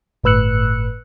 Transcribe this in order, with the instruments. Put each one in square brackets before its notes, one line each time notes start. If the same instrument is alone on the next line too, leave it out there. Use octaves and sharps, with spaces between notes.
[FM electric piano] G1 A2 B4 E6 F#6 C#7